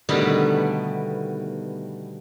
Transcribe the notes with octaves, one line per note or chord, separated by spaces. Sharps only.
B2 D3 D#3 G3 A3 B3